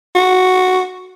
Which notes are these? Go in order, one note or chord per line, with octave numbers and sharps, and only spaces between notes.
F#4